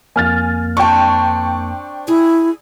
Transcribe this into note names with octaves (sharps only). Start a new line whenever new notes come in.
F2 A#3 G#5 F6 A6
C4 D4 G5 C#6
E4 G#4